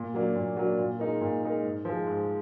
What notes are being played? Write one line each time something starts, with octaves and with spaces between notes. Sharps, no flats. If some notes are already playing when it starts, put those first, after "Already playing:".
Already playing: A#2
F#3 A#3 D4
A#2
F#3 A#3 D4
A#2
G#3 D#4 A#4
A#2
G#3 D#4 A#4
G#2
F3 G#3
G#2